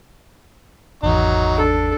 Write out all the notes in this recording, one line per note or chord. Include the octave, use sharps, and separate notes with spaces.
G#1 E2 F#3 D#4
D4 A4